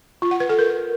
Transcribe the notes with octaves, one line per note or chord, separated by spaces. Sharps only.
F4
F#5
B4
A4
A#4